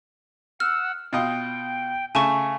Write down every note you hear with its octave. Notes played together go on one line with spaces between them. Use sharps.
F#5 E6 F6
B2 F4 D#5 G5
C#3 A3 G#5 A5 C#6